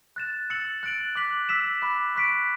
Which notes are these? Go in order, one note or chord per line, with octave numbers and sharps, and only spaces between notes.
F#6 A6 E7
E6 A6 C#7 F#7
F#6 A6 D7 F#7
D6 F#6 B6 F#7
E6 B6 E7
B5 D6 F#6
C#6 F#6 B6 D7